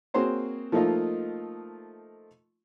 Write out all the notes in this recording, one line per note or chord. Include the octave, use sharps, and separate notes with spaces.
A#3 C4 F#4 G#4 C5 C#5
F3 A3 A#3 D#4 F4 D#5